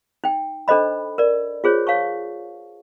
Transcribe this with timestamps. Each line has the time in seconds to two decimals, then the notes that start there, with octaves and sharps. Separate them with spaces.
0.24 D#4 G5
0.68 D4 A4 C5 D#5 B5
1.18 A#4 D5
1.64 F4 G#4 C5 C#5
1.87 C#5 F5 A5 C#6